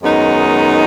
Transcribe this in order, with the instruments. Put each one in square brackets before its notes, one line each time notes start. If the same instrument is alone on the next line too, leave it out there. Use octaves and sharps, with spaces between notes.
[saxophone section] F#2 D#3 G#3 B3 D#4